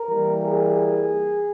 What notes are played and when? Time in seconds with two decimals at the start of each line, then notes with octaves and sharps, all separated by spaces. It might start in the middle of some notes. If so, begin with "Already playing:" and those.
Already playing: A#4
0.10 E3 G3 A#3
0.41 G#4